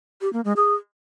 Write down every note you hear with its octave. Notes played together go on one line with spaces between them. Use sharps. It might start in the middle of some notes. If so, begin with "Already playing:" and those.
G4
A#3
G#3
G#4